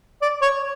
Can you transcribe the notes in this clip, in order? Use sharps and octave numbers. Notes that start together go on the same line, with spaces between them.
D5
C#5